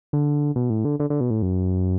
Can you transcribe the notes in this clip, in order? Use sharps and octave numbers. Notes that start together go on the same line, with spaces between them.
D3
B2
A2
D3
D3
D3
B2
A2
F#2